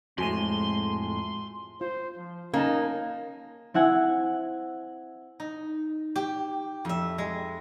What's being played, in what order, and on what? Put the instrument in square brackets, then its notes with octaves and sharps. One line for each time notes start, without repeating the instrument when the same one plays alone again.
[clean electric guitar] F2 A2 [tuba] G#3 [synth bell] F#4 G#5 D#7 [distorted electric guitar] C6
[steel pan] F4 [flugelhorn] C5
[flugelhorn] F3
[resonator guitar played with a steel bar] A#3 [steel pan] C#4 F5 A5 [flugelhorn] D#4
[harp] C4 E4 F#5 G#5
[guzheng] D#4
G4
F2 E5
G#3